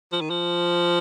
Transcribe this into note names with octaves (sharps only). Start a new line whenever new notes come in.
F3
D#3
F3